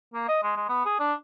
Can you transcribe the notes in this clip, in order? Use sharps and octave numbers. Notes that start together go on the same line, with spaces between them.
A#3
D#5
G#3
G#3
B3
G#4
D4